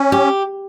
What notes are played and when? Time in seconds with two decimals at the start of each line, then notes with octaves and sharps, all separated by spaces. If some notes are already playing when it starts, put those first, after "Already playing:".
Already playing: C#4
0.12 G4